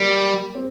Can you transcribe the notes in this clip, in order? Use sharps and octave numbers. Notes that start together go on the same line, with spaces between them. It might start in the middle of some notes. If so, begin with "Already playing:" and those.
Already playing: G3 A#3
C4